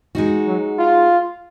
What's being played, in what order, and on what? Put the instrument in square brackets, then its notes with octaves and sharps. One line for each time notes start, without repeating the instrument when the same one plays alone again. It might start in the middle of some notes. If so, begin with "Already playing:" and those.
[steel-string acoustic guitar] G#3 D#4 F#4
[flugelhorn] F#3
F4